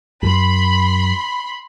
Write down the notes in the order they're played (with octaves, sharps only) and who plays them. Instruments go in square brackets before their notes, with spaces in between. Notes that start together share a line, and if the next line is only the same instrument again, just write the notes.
[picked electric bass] F#2 [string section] B5 C6